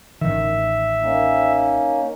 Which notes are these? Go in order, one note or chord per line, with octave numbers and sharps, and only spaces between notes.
A1 D#3 E5
A#3 C#4 D#4